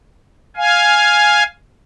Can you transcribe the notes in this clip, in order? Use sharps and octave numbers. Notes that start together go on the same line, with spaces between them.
F5 G#5